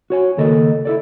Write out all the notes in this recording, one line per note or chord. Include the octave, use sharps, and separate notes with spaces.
F#4 C#5 G#5
D#2 C#3 A#3 A4 A#4 D#5
E4 A4 D5